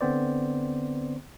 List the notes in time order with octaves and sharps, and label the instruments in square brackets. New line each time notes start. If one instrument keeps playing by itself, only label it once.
[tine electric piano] D3 B3 C4 C5 D5